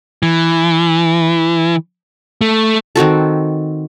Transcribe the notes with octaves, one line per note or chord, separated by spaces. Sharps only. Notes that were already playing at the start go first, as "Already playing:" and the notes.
E3
A3
D#3 C4 F#4 A4